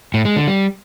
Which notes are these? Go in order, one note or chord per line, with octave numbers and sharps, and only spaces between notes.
A2
G#3
D3
G3